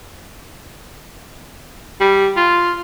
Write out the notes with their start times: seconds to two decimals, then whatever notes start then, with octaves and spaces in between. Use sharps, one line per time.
2.01 G3
2.37 F4